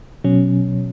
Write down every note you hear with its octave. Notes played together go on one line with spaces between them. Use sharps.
B2 F#3 C#4